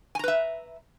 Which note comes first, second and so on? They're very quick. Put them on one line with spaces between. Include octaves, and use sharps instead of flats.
G#5 A#5 B4 E5